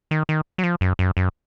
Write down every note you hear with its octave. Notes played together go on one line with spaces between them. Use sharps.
D#3
D#3
F#3
F3
F#2
F#2
F#2